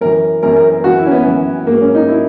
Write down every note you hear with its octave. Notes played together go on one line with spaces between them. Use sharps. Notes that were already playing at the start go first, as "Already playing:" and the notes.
F#2 E3 A#4
F#2 E3 A#4
A#4
A#4
F#2 E3 F#4
E4
C#4
B3
F#2 E3
G#2 F#3 A#3
C#4
D#4
F#3 E4